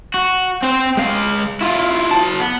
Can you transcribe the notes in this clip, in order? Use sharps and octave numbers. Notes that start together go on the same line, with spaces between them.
F#4
C4 C5
G#3 F5
E4 F4
F#3 A5
B3